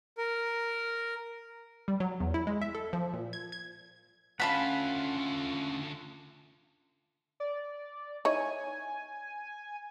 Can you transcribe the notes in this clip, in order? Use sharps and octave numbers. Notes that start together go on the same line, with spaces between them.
A#4
G3
F#3
E2
E4
G#3
E5
A4
F3
A#2
G#6
G#6
D3 A3 C#4 F4 F5 F#5 A5 B5
D5
D#4 E4 C#5 G#5